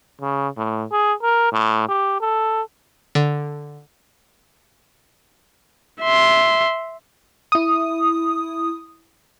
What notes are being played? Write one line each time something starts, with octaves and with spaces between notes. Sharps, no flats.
C#3
A2
G#4
A#4
A2
G4
A4
D3
E5 C6
E4 D#6